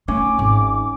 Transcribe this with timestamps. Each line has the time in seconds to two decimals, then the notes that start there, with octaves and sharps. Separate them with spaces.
0.08 A3 C#4 D6
0.39 G#1